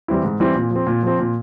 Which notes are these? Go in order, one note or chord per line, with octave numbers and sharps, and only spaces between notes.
E3 G3 C4 E4
G#2
E3 G3 C4 E4
A#2
F3 C4
A#2
F3 C4
A#2